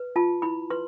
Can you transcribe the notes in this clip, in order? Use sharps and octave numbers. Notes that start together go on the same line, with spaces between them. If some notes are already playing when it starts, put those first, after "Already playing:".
Already playing: B4
F4 A5
E4 B5
B4 C6